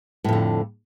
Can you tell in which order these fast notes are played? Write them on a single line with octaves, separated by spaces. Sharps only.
A2 F2 D3